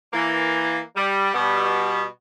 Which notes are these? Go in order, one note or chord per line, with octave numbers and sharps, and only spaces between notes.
E3 A#3
G3
B2 G3 B3